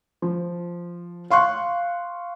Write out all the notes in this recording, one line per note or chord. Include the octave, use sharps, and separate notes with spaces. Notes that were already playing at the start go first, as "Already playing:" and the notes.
F3
F5 C6 C#6 F#6